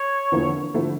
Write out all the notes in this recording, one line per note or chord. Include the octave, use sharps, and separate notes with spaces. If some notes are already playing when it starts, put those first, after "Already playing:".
Already playing: C#5
E2 D3 F3 A#3 E4
D3 F3 A3 E4